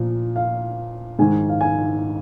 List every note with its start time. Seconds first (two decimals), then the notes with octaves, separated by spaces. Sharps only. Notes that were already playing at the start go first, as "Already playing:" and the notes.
Already playing: A#2 F3
0.36 F5
1.19 G#2 D#3 G#5
1.49 F5
1.61 G#5